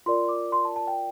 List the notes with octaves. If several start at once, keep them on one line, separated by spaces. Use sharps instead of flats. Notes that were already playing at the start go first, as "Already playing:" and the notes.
F4 A#4 D5 C6
D6
C6
A5
A5
G5